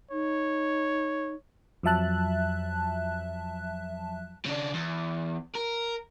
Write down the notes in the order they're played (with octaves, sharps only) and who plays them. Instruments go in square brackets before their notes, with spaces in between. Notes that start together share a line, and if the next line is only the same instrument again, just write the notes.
[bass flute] D#4 [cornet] C#5
[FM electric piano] F2 F3 F#3 E5 A5 F#6
[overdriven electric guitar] C#3 D4
E2
A#4